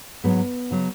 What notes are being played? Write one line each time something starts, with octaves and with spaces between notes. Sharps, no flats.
G#2 F#3 B3
C#3 F#3